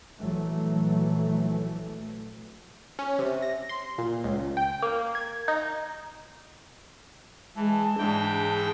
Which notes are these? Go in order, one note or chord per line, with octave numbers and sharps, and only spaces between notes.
A#1 E3 F#3 A3
C#4
C3
A#6
C6
A#2
C#2
G5
A#3
G#6
D#4
E3 G#3 A5
G#2 E3 D4 G5
G#4